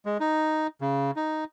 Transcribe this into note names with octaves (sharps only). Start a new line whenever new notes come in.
G#3
D#4
C#3
D#4